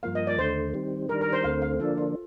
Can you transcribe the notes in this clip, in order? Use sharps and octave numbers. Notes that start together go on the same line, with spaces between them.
G2 F3 A#3 F5
D#5
D5
D#2 D3 A3 C5
D#3 G3 C4
D#3 G3 D4 A#4
A#4
C5
D2 D3 A3 C4 F5
F5
D3 F3 A#3 D4 A4
F4